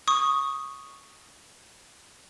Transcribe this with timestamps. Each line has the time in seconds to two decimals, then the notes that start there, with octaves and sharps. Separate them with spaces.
0.08 C#6 D#6